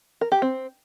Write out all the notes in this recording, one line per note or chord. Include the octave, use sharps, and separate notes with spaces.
A#4
G4
C4